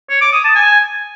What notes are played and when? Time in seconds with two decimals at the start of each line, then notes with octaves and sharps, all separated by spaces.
0.10 C#5
0.21 D6
0.33 D#6
0.44 A5
0.55 G#5